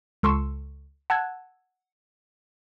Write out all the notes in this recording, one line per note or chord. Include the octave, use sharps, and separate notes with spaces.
C#2 A4 C6 C#6 E6
F#5 A5 E6 F#6 G#6